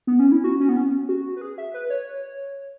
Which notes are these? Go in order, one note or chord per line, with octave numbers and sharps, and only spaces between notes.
B3
C#4
E4
F#4
C#4
B3
C#4
F#4
B4
G#4
E5
B4
C#5